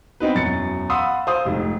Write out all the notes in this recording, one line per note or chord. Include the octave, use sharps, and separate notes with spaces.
B3 C4 D#4 B4
E1 F#2 A6 C#7
F5 F#5 B5 C6 D#6 E6
C5 F5 C6 D#6
F1 G#2